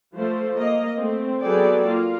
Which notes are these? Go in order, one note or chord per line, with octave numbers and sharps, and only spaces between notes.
F3 A3 C5
A#3 D#5
A3 C4
F#3 B3 G#4 A4 D5 G5
A#3 F4